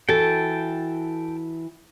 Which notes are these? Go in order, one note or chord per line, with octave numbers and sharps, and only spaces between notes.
E3 F#4 A4 G5 A5